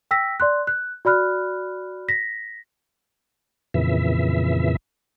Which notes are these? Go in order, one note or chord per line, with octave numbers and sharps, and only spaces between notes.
G5 E6 A#6 B6
D5 C6 F#6
F#6
F#4 D5 B5 F6 F#6
A#6 B6
F2 A#2 C#3 E3 E5